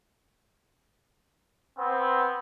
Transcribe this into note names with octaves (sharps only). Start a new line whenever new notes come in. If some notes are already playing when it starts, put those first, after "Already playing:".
B3 C4